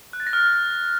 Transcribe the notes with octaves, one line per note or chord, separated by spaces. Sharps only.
F#6
A6
A#6
F6